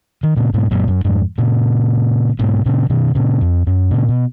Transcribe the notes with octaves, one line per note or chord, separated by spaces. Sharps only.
D#3
A#2 C#3
G#2 B2
F#2 A#2
F#2
F2 G#2
A#2 C#3
G#2 B2
A#2 C#3
B2 D#3
A#2 C#3
F2
F#2
A#2 C#3
B2